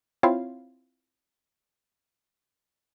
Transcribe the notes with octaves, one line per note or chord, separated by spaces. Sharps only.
C4 E4 F4 C5 C#5 F5